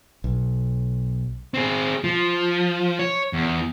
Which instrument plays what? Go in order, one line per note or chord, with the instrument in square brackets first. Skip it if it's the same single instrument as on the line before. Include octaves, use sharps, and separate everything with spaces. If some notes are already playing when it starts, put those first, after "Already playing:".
[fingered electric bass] B1
[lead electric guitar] C4 G#4
F3
C#5
E2